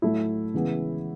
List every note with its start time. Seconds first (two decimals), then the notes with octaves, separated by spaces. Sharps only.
0.02 A2 F#3 A3 E4
0.54 C#3 E3 G#3 B3